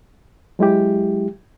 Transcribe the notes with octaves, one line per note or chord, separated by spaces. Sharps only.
F#3 G#3 E4 G4